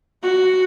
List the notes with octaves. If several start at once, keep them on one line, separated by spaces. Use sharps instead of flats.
F#4